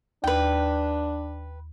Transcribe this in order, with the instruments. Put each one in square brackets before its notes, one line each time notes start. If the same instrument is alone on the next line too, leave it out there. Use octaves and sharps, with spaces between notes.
[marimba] D#2 [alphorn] D4 [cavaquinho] B4 G5